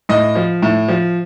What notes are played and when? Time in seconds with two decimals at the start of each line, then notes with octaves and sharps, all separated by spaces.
0.09 A2 D#5
0.35 F3
0.62 A2
0.88 F3